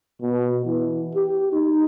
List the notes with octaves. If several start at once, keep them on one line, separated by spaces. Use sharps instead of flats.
B2
E3
G4
D#4